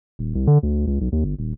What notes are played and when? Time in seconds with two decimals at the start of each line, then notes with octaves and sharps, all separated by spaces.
0.19 D#1
0.35 C2
0.47 D3
0.63 D2
0.87 C#2
1.01 B1
1.12 D#2
1.24 G1
1.39 D#1